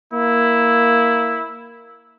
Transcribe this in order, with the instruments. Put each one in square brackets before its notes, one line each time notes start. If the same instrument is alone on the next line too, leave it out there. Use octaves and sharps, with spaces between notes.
[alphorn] A#3 [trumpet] E4